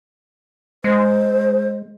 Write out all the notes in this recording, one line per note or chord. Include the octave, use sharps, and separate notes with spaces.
G#3 C5